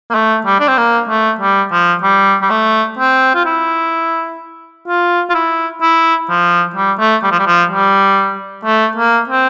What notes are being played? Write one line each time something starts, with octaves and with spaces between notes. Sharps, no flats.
A#3
A3
G3
D4
C4
A#3
A3
G3
F3
G3
G3
A3
C4
F4
E4
F4
F4
E4
E4
F3
G3
A3
G3
F3
G3
F3
G3
A3
A#3
C4